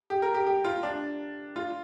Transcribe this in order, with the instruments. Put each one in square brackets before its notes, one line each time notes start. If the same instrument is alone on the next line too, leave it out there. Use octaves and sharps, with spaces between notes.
[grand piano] G4
A#4
G4
G4
F4
D4
F4